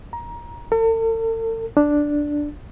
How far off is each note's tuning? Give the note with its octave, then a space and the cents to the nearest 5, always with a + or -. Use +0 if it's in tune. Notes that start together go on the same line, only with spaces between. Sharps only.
A#5 +20
A4 +45
D4 +0